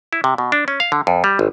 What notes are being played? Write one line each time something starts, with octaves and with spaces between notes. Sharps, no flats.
E4
C3
B2
D4
C#4
F5
D3
F2
G3
G#1